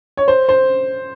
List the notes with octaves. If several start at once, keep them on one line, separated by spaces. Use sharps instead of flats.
C#5
C5
C5